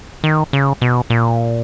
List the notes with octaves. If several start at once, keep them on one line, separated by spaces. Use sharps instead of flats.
D#3
C#3
B2
A#2